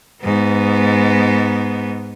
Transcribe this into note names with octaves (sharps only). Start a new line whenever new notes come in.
G#2 B3